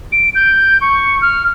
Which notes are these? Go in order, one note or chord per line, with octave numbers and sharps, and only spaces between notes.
D7
G6
C#6
F6